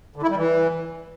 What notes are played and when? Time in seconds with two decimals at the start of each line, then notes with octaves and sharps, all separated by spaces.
0.16 D3
0.23 E4
0.29 G3
0.36 E3